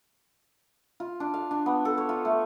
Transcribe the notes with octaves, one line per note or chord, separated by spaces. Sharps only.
F4
D4
F5
D4
B3
A4
C#5
F4
A3